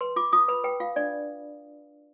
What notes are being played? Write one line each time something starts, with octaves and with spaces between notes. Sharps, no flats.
B4 C6
F4 D6
F4 D#6
B4 B5
B4 G5
F4 F5
D4 D5